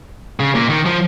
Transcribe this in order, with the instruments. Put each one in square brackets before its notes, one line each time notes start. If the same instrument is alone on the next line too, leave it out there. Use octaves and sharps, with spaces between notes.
[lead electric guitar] C#3
A#2
D#3
F3